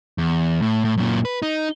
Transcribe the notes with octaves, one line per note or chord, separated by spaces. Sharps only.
E2
A2
A2
F#2 A#2
B4
D#4